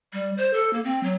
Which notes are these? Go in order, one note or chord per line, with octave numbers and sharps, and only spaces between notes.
G3
C5
A4
A#3
C4
F#3